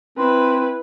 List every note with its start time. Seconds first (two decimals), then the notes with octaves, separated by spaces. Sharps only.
0.18 C4 E4 B4